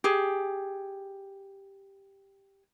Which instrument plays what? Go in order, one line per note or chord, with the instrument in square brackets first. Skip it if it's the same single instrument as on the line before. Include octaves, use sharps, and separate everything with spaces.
[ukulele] G4 G#4